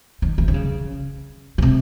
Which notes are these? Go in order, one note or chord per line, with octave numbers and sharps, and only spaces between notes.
D#3
E3
D3
C#3
C#3
C3